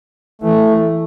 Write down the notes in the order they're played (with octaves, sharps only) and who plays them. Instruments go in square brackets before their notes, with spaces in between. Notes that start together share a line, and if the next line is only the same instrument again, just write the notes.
[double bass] E3 [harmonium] A3